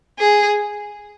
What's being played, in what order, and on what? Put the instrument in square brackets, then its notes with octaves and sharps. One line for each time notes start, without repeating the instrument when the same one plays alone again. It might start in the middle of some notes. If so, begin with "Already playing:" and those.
[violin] G#4